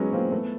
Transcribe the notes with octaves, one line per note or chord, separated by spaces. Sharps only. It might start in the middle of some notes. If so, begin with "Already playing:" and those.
Already playing: F#3 G#3 B3 C#4
A#3 C4
A3 B3